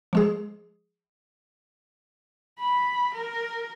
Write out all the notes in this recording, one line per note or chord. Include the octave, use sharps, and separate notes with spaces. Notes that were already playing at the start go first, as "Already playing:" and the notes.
F3 G#3 G#4
B5
A#4